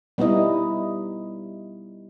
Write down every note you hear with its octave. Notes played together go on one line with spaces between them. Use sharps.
G3 B3 D#4 E4 D#5